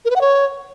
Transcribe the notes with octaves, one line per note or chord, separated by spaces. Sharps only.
A#4
B4
F#5
C#5